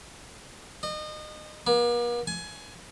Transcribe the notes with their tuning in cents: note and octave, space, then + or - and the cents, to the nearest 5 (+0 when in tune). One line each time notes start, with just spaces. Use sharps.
D#5 -30
A#3 +45
G#5 +20